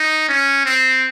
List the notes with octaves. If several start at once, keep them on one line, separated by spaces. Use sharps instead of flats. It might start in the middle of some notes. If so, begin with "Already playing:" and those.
Already playing: D#4
C#4
C4